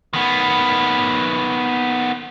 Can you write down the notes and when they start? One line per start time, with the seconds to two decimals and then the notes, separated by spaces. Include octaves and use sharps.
0.13 D#3 B3